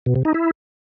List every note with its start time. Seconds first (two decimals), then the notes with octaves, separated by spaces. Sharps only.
0.06 B2
0.16 C3
0.25 D#4
0.34 E4